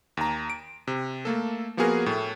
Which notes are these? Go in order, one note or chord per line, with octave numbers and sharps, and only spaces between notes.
D#2 A#5
D7
C3
A3 A#3 A4
F3 A#3 B3 F#4 G#4 A#4
A2 A3